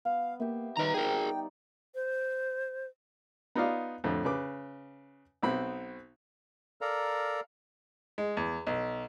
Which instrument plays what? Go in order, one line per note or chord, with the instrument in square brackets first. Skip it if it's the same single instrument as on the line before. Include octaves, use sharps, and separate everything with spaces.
[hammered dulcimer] B3 [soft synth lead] F5
[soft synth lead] A#3 [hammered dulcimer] G4 E5
[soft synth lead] D#3 [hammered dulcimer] G3 D#4 D5 [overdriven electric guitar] B4 A#5
[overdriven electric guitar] G#4 A#4 [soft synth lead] G5
[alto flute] C5
[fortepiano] B3 D#4 F4 D5 F5
F2 A2 D3
C#3 B4 D6
B1 B3 C4 B5
[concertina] A4 A#4 D5 F5 A#5
[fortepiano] G#3
E2
B1